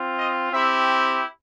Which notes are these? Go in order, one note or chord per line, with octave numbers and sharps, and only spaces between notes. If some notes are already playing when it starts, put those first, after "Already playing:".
Already playing: C4 F4
D#5
C4 E4 G4 E5